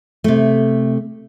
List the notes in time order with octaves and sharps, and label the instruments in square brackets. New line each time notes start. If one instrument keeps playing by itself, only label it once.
[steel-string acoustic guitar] C3 A3